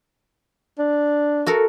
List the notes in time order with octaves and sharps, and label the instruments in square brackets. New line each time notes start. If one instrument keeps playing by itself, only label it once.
[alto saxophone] D4
[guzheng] F#4 A4 A#4